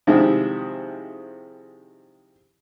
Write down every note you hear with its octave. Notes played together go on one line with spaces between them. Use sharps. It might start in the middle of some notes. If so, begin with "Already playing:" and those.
C3 D#3 F3 G3 G#3 E4